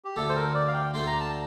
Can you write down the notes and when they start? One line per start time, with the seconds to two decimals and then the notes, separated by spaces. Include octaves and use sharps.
0.05 G4
0.16 D2 D3 A3 A4
0.29 C5
0.36 A#4
0.54 D5
0.68 F5
0.74 G5
0.94 D2 D3 A3 D4 C6
1.07 A#5
1.20 A5